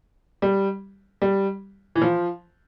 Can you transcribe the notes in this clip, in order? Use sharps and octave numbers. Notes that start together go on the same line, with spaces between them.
G3
G3
E3
F3